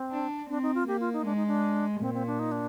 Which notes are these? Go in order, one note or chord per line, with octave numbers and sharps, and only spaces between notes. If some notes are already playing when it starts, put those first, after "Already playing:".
Already playing: C4
D4
C4 D4
D#4
F4
A#3 G4
F4
D#4
G#3 D4
D#4
D4
A#2 C4
C4
D4
D#4
D4